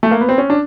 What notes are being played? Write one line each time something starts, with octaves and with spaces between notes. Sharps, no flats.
A3
A#3
B3
C4
C#4
D4